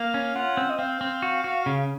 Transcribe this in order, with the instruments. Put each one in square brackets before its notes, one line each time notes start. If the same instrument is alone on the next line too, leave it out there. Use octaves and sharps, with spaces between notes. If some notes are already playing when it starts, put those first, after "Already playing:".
Already playing: [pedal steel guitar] A#3 [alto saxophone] F5
[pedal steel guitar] C#4
[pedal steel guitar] F4 [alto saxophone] F#5
[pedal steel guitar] C4
[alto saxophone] D#5
[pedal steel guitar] C4 [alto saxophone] F5
[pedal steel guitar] C4
F#4
F#4
C#3